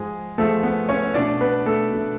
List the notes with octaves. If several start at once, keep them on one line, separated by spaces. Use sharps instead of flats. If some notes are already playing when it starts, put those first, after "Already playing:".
Already playing: G#2 F3 G#3 G#4
G#2 F3 G#3 A3 A4
B3 B4
C#4 C#5
B2 A3 D4 D5
B3 B4
A3 A4
B2 A3